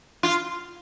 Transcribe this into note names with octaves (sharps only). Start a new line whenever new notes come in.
F4